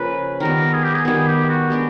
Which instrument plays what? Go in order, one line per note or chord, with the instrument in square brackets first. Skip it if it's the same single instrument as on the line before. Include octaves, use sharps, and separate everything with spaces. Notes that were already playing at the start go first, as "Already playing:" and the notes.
Already playing: [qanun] C#3 F3 A#3 [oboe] B4
[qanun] D#3 G3 B3 [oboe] A#4
[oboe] G#4
G4
G#4
[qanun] D#3 G3 B3 [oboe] G#4
[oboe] G4
F#4
[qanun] G#3 B3 D4 G4